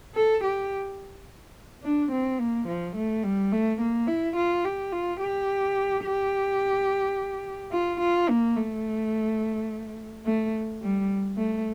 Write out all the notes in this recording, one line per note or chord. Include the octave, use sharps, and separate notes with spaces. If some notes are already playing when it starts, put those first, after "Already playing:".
A4
G4
D4
C4
A#3
F3
A3
G3
A3
A#3
E4
F4
G4
F4
G4
G4
F4
F4
A#3
A3
A3
G3
A3